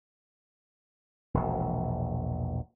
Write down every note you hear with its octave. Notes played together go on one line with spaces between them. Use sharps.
E1 A#1